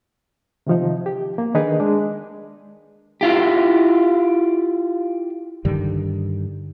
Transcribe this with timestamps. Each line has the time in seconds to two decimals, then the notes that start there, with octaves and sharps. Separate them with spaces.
0.67 C3 D#3 F3 D#4
1.06 G4
1.38 A#3
1.54 D#3 D4 D#4 G#4 A#4 B4
1.80 G#3 D4
3.21 E4 F4 G4
5.65 G2 D3 D#3 G3